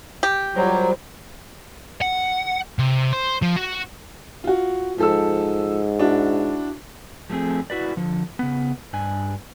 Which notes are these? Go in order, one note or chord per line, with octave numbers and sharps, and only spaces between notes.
G4
F#3 G3 D4 F4 A#4 C5
F#5
C3
C5
F3
F#4
F4 F#4
G#2 F3 A4 E6
D4 E4 F#4
F3 G#3 A3 C4 G#4
E4 F#4 B4 D5
D3 F3
C#3 B3
G2 D4 G#5